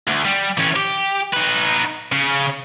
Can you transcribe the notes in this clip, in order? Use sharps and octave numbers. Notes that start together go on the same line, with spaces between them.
D2
G3
E3 C#4
G4
D#4 B4
C#3